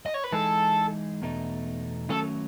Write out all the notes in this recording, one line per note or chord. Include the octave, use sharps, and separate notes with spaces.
D#5
C#5
B4
E3 G#3 D#4 G#4 A4
E2 B2 A3 D#4
D#3 F#3 A3 C#4 A4